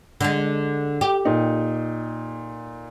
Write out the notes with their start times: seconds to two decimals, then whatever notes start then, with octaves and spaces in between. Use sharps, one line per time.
0.21 D3 G#3
1.01 G4
1.25 A#2 D#4